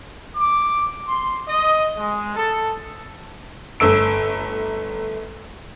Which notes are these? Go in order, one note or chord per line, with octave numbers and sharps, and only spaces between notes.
D6
C6
D#5
G#3
A4
G1 A3 E6 D7